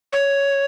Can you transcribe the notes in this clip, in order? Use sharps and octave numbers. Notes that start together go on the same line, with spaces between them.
C#5